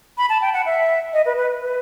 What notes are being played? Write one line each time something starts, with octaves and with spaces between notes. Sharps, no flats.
B5
A5
G5
F#5
E5
D#5
B4
B4
B4